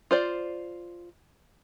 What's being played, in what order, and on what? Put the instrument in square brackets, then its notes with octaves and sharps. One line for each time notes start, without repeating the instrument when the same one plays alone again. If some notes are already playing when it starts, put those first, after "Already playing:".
[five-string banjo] F4 C5 D5